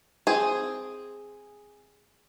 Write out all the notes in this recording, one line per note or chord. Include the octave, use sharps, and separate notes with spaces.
C4 G#4